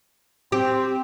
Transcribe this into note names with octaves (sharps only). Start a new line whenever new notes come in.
C4 G4